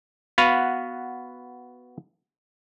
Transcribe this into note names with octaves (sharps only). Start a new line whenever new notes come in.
B3 F#4 B4 F5